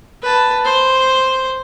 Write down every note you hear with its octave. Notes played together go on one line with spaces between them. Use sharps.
B4 A5
C5